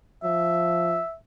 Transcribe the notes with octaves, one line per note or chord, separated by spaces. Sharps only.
F3 E5